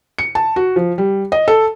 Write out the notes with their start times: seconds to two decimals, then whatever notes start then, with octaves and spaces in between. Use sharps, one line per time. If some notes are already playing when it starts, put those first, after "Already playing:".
0.18 C#7
0.35 A5
0.56 F#4
0.76 F3
0.98 G3
1.32 D#5
1.48 A4